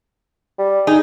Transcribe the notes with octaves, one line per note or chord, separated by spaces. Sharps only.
G3
D#4 G#4